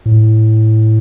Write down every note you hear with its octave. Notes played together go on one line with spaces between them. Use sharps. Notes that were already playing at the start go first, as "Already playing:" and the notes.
A2